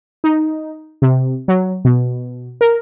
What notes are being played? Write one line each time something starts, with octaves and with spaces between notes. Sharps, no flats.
D#4
C3
F#3
B2
A#4